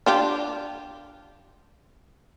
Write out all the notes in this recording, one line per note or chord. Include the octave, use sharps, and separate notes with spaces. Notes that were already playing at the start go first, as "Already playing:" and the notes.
D4 F4 G4